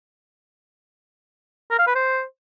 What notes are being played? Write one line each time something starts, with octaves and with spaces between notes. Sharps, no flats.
A#4
F5
B4
C5